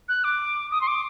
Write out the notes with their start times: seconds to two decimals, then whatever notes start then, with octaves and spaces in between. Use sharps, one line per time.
0.08 F#6
0.24 D6
0.71 D#6
0.81 C6
0.87 D6